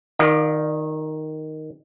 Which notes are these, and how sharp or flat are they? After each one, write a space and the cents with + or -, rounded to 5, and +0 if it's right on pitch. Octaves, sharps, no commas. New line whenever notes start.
D#3 +0 F4 +30 D5 +45